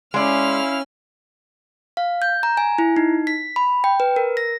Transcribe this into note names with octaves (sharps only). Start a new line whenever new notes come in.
G#3 C#4 E4 D5 F5 F6
F5
G6
A#5
G#5
E4
D#4
B6
B5
G5
B4
A#4
A#6